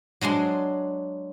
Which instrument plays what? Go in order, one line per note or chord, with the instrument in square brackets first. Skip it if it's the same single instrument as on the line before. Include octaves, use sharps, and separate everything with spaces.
[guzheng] F#3 G#3 D4 C6